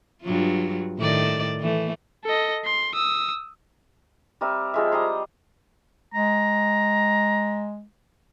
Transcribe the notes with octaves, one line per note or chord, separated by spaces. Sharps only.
G2 F#3 F4
A2 D#3 D5
E3 A3
A4 D#5
C6
D#6 E6
G3 C4 A#4 E5
F3 G#3 E5
G3 D#5 A#5 C6
G#3 A#5